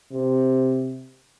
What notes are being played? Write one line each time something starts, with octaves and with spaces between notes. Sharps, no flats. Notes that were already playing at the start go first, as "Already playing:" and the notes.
C3